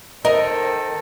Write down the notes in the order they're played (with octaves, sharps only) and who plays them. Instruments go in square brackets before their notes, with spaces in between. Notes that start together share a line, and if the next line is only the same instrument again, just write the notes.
[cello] D#3 A4 [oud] A#4 [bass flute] C5 [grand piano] D#5